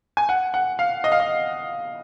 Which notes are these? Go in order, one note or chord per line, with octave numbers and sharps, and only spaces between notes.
G#5
F#5
F#5
F5
D#5
F5
D#5